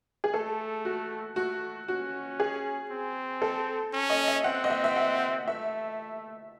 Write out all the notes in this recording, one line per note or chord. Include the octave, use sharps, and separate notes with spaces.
G#4
A3 A4
F#4
A3 F#4
C#4 F#4
G#4
C4
A4
C#4
D#5
E5
C4 F#5
D#5
E5
E5
F#5
A3 E5